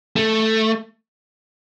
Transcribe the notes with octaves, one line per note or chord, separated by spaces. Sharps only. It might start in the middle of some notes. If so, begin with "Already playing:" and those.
A3